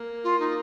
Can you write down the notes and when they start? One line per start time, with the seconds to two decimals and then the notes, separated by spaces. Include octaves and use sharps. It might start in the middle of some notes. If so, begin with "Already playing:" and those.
Already playing: A#3
0.24 F4
0.40 D#4